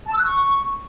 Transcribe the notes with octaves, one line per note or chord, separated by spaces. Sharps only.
A5
E6
F#6
C#6